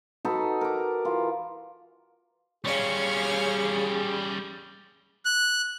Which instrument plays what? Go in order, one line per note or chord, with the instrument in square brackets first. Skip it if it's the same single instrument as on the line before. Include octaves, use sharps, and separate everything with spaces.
[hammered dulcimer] D#4 F#4 A4 B4
A#4 D6
E3 F4
[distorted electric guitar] G3 C#4 [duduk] G#4 [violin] C#5 F5
[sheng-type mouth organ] F#6